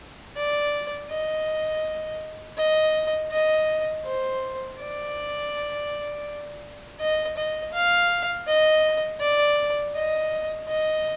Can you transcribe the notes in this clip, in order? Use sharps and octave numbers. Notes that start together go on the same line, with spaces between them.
D5
D#5
D#5
D#5
C5
D5
D#5
D#5
F5
D#5
D5
D#5
D#5